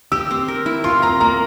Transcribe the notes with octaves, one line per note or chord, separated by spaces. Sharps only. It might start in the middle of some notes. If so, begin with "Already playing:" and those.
G4 E6
C4
A#4
E4
F4 C6
C4 A#5
A#3 A#5